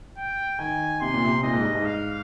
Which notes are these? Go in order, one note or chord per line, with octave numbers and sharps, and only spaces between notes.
G5
D#3 G#5
C3 C6
A#2
C3
A#2 D#5
G#2
G2
G#2
F5